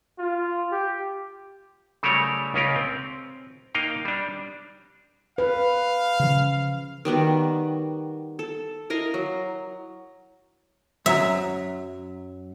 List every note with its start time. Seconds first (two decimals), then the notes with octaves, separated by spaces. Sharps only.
0.18 F4
0.72 G4
2.03 C#3 F#3 G3 A3 A#4 C#5
2.54 C#2 C#3 A#3 C#4 F4 A#4
2.76 C4
3.74 A#3 D#4 F5 G5
4.05 G3 D4
5.38 B4 F5
6.20 C#3 F3
7.05 D#3 G3 B3 F#4
8.39 A4
8.90 E4 A#4 D#5 F5
9.14 F#3
11.06 F#2 F#3 E5 A#5